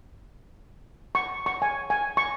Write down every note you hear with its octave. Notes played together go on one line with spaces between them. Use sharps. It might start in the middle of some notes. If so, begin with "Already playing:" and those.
C#6
C#6
G#5
G#5
C#6